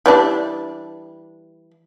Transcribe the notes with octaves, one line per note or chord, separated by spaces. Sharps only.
E3 G3 D4